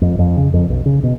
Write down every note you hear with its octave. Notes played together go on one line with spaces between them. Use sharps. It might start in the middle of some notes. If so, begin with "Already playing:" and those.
F2
F2
C#3
F2
B1
C#3
B2